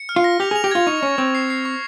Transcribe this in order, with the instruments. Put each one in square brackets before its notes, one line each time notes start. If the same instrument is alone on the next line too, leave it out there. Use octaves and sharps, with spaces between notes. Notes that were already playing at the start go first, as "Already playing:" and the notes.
Already playing: [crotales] C#7
F6
[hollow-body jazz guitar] F4
[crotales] A#6
[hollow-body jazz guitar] G4 [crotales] F7
[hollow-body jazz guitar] G#4 [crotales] F7
[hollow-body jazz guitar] G4
[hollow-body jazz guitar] F4 [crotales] G#6
[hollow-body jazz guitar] D#4 [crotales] C#6
[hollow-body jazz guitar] C#4 [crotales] C#6
[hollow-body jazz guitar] C4 [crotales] C#6
[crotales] C7
C7
C#6